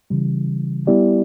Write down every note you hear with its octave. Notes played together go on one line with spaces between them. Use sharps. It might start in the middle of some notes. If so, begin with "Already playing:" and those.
C#3 E3 G3
G3 B3 E4 G4 D5